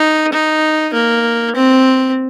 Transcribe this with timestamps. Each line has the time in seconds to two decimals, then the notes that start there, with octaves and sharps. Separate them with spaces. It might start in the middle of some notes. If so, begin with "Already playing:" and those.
Already playing: D#4
0.33 D#4
0.94 A#3
1.56 C4